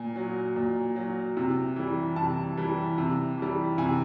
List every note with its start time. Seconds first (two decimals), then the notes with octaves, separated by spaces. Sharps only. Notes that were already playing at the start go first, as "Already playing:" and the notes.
Already playing: A#2 G#5
0.16 F#3
0.56 A#2
0.96 F#3
1.37 C3
1.76 E3 G3
2.16 C3 A5
2.57 E3 G3
2.98 C3
3.38 E3 G3
3.78 C3 G#5